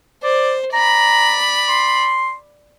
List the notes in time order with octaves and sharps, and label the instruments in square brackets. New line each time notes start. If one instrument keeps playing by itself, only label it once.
[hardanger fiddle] C5 [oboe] D5
[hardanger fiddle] D5 B5 [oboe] A#5
[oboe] C6